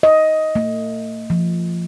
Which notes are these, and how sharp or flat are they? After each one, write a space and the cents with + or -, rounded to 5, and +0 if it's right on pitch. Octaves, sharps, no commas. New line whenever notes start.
D#5 +10
A3 +45
F3 -20